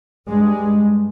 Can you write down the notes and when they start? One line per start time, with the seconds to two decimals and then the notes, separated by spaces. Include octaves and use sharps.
0.28 G2 G#3